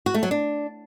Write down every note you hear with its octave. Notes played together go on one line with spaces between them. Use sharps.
F#4
A3
F#3
D4